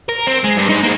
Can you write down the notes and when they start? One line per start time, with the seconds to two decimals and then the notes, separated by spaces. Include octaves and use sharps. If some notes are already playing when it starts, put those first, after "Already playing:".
0.09 A#4
0.27 C4
0.44 G#3
0.57 G2
0.69 D#4 C5
0.83 A#3 G#4